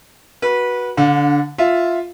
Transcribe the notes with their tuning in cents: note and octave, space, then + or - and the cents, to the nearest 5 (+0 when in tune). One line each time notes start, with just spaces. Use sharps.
F#4 +0 B4 -20
D3 -15 D4 +0 F5 +40
F4 +0 E5 +0